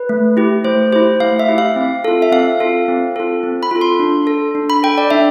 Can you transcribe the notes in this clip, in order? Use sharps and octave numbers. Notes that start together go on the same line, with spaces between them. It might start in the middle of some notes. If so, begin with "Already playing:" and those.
Already playing: B4
A3
E4 G4
A3 C5
E4 G4 C5
A3 F5
E5
E4 G4
F5
C4
F4 A4
E5
C4 F5
F4 A4
C4
F4 A4
C4
B5
F4 A4
C6
D4
A4
D4
B5
A4 G5
D5
D4 E5